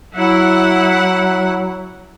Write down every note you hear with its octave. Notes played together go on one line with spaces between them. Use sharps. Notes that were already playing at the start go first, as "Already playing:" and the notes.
F#3 E4 F#5